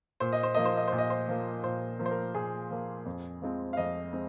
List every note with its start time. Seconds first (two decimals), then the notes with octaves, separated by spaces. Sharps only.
0.20 A#2 C5
0.32 D#5
0.43 C5
0.54 F3 A#3 D#5
0.65 C5
0.77 D#5
0.88 A#2 C5
0.98 D#5
1.10 C5
1.28 F3 A#3
1.64 A#2 C5
1.99 F3 A#3
2.06 C5
2.11 A#4
2.35 A#2 G#4
2.70 F3 A#3
3.06 F2
3.42 F3 G#3 C4
3.73 F5
3.77 F2 D#5
4.13 G#3 C4